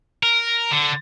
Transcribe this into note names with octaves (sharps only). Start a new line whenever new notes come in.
A#4
D3